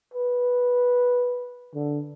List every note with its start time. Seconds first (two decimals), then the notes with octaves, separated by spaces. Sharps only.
0.14 B4
1.74 D3